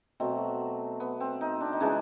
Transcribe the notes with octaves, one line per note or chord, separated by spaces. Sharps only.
B2 F#3 A3 C4
B3
C4
D#4
D4
D#4
C#3 E3 G#3 D4